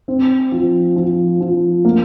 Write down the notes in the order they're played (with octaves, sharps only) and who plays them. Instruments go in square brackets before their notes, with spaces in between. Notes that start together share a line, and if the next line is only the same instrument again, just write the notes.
[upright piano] C4
F3
F3
F3
A#3